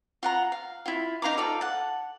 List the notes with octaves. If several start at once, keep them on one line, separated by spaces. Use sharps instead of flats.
F4 F#5 A#5
F5
E4 F4
D#4 F5 A#5 D6
F4 A4 D5 F5
F#5 A5